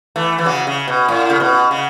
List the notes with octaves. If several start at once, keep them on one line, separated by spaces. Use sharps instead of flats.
E3 A3
E3
C#3 F#3
C#3
B2
A2
C#3
B2
C#3